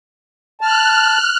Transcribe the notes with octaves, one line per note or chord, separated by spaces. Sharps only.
A5 F6 F#6